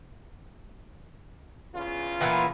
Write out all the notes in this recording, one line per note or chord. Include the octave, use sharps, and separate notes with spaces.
E2 C#3 F4
A#2 E3 B3